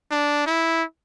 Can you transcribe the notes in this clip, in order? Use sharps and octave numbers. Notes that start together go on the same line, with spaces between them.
D4
E4